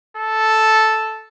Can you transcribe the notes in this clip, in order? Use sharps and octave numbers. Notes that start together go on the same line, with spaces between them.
A4